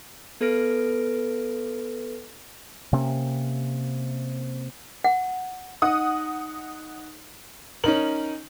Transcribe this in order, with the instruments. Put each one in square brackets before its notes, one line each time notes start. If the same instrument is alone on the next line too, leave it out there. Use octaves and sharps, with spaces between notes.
[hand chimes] B3 A4 B4 F6 A#6 D7
[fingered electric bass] C3 A#3 C#4
[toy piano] F#5
[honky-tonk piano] D#4 F#5 D#6
[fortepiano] C#4 D#4 A#4 [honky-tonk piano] F#7